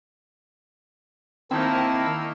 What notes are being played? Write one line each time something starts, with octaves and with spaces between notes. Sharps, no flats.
D#3 A#3 C4 D#4 E4 A5 E6